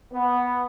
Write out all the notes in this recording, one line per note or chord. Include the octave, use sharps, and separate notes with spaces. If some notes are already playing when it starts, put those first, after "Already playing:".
B3